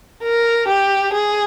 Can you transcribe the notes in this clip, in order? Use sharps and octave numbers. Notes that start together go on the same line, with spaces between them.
A#4
G4
G#4